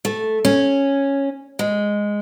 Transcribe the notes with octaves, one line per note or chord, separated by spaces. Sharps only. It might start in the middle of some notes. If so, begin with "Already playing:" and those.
A3
C#4
G#3